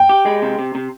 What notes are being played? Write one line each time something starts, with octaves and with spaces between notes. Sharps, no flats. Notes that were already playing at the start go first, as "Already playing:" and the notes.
Already playing: G5
G4
G#3
C3
C3
C3